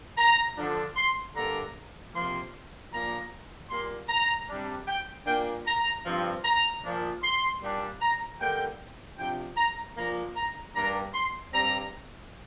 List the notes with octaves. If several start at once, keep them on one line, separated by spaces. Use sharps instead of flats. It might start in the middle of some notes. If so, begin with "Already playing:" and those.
A#5
D3 F3 D4
C6
G2 D3 A#3 D4 A#5
C3 F3 A#3 C6
A#2 F3 A#3 D4 A#5
A#2 G3 A#3 C6
A#5
C3 G3 D4
G5
A#2 A#3 D4 G5
A#5
G2 F3 C4
A#5
A#2 F3 D4
C6
A#2 G3 D4
A#5
G2 D3 A#3 G5
C3 F3 D4 G5
A#5
A#2 F3 A#3 D4 A#5
A#5
G2 G3 A#3 D4 A#5
C6
G2 G3 C4 A#5